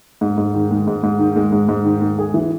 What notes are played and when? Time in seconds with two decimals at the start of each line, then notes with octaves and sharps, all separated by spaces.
0.21 G#2
0.38 G#2
0.55 D#3
0.71 G#3
0.87 G#2
1.03 G#2
1.19 D#3
1.36 G#3
1.52 G#2
1.69 G#2
1.85 D#3
2.01 G#3
2.19 G#4
2.34 E3